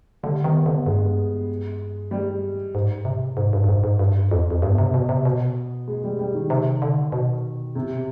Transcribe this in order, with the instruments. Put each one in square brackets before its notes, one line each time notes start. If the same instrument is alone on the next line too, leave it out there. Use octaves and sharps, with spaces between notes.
[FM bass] D3 [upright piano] G3
[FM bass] D#3 [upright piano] B3
[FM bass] D3 [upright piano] B3
[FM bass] G2 [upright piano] G#3
[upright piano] G3
[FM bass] G#2
C3
G#2
G2
G2
G#2
G#2
G2
F2
F2
[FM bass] G2 [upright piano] B3
[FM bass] C3
B2
C3
B2
[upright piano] G#3
G3
G3
D#3
[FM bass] C3
D3
B2
[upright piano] C3